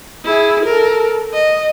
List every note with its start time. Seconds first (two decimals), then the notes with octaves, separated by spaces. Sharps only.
0.25 E4 G#4
0.65 A4 A#4
1.34 D#5